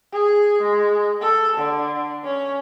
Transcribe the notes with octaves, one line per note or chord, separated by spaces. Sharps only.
G#4
G#3
A4
D3
C#4